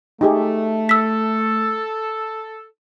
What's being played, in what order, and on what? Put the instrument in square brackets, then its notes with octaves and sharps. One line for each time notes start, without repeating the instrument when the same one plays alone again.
[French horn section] A3 [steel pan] D#4 G4 G#4
[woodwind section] A4 [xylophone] E6 B6